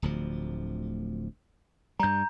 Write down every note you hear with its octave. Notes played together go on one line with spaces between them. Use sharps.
D1 D2 F3
G2 G3 A#5 G6